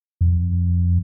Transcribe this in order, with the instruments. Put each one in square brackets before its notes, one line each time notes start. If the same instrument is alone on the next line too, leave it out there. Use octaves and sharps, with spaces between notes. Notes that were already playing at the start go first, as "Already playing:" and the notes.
[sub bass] F2